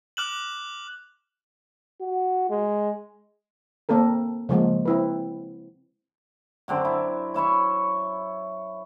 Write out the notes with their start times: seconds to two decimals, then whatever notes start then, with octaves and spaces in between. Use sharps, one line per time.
0.17 D6 F6 F#6 E7 F#7
2.01 F#4
2.50 G#3
3.89 A#3 C4 A4 A#4
4.49 C#3 F3 G#3 A#3
4.86 C4 E4 B4
6.68 F#2 D3 C4 D5
6.85 E4
7.34 C#5 E5 B5 C#6